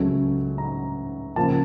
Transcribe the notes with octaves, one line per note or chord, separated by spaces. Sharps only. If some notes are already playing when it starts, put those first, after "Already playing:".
Already playing: C#2 C#3 F#3 A3
A#5
C#3 F3 A#3 A5